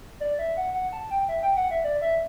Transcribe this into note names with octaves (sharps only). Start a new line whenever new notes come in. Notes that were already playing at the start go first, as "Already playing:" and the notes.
D5
E5
F#5
F#5
A5
G5
E5
G5
F#5
E5
D5
E5